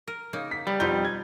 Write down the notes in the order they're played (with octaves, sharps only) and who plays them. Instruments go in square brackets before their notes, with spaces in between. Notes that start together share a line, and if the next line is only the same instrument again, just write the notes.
[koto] A#4
C#3 A#3 D#4
[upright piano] B6
[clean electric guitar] G3 [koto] B3
[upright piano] F2 G6 [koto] B2 C4 D#4
[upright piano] G#6